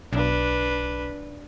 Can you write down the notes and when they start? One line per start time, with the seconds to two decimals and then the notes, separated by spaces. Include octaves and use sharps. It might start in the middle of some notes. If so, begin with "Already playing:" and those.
0.13 B1 D4 B4